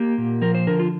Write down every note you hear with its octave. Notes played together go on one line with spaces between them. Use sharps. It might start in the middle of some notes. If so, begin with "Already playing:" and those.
Already playing: A#3 G4
A#2
F3 A#4
C5
D3 A#4
F4